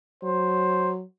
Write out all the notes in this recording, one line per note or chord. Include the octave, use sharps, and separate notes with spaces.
F#3 C5